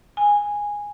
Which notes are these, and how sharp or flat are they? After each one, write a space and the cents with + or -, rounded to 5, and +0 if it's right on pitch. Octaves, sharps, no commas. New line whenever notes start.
G#5 -10